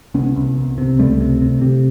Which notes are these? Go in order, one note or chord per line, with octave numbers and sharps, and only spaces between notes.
C2 B3 C#4
C2
C2
C3
C#2 G3 A3
C3
C3
C3